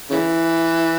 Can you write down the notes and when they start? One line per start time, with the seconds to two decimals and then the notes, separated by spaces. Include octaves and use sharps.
0.10 C#3 E3